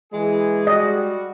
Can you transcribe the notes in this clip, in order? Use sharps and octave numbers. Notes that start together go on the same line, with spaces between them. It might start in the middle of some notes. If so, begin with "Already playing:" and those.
E3 G#3 E4 G#4
G3 F#4 D#5